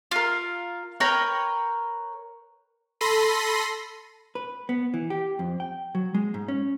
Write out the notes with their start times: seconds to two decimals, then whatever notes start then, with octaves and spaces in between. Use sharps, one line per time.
0.11 F4 A#4
1.00 A#4 B4 C#5 G5
3.01 A4 B5 C6 A#6 C7 D#7
4.35 B4
4.69 B3
4.94 E3
5.10 G4
5.39 F2
5.60 G5
5.95 F#3
6.15 G#3
6.34 G#2
6.48 C#4